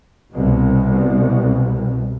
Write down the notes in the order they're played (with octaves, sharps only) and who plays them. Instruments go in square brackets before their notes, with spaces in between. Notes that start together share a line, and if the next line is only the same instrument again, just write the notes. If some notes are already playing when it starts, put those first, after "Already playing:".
[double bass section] C2 B2